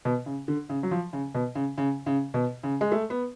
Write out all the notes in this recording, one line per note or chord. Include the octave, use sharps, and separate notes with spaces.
B2
C#3
D3
C#3
F#3
F3
C#3
B2
C#3
C#3
C#3
B2
C#3
G#3
A3
B3